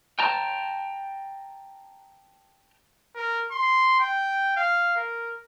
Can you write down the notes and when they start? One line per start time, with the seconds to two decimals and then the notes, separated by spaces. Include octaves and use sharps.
0.19 G5 A5 A#5
3.15 A#4
3.51 C6
4.00 G5
4.57 F5
4.96 A#4